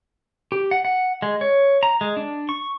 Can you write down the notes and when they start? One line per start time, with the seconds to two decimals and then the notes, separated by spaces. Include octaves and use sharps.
0.52 G4
0.71 F#5
0.85 F#5
1.22 G#3
1.41 C#5
1.83 A#5
2.01 G#3
2.17 D4
2.49 C#6